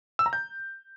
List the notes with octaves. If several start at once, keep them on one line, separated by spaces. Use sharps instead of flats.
E6
A#5
G6